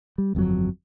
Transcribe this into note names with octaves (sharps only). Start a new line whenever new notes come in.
G3
G1 F2 G#2 F#3